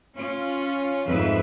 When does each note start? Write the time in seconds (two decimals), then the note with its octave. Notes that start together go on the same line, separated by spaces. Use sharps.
0.17 C#4 F4
1.08 F2 G#2 B4 E5